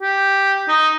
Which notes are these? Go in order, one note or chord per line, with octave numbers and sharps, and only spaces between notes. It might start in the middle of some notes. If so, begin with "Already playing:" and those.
G4
D#4